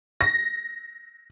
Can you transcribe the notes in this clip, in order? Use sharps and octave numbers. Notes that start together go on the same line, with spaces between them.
A#6